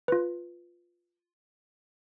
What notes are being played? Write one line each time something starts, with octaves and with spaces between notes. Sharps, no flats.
F4 B4